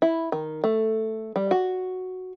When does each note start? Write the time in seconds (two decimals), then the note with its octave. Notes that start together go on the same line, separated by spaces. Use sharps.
0.02 E4
0.32 D#3
0.64 A3
1.36 G3
1.51 F#4